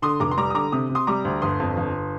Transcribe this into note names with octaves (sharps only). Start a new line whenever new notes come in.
D3 C6 D#6
F1 A#5 D6
C6
G3 A#5 D6
D#6
D3 A#5 D6
C3 D#6
C3
C6 D#6
G3 A#5 D6
D2
G1 C6 D#6
F2
G1